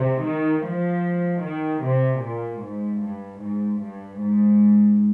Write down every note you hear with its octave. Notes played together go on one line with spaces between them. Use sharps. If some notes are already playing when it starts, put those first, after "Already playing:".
Already playing: C3
D#3
F3
D#3
C3
A#2
G#2
G2
G#2
G2
G#2